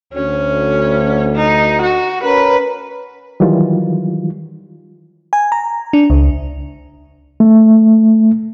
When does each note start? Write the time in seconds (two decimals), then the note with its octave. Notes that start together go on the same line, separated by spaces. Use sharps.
0.14 D2 C#4
1.35 D#4
1.82 F#4
2.24 C#4 A#4 B4
3.40 D#3 E3 F#3 G3 F4
5.33 G#5
5.52 A#5
5.93 D4
6.10 C#2
7.40 A3